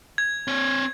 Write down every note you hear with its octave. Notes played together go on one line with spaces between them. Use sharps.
G#6
C4 C#5